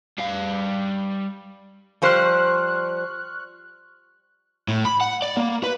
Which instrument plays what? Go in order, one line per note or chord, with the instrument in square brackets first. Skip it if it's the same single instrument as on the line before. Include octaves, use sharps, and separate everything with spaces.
[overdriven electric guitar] G3 F5
[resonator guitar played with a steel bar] F3 G3 C5 [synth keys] C#6 F6 F#6
[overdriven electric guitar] A2
B5
F#5
D5
A#3
B4